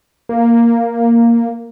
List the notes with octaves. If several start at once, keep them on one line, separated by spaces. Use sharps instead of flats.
A#3